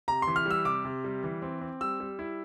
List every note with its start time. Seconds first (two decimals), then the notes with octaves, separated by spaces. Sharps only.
0.08 C3 A#5
0.22 E3 C6
0.36 F6
0.46 G3 E6
0.65 C3 D6
0.85 C3
1.04 G3
1.24 E3
1.42 C4
1.61 C4
1.81 G3 E6
2.00 G3
2.19 E4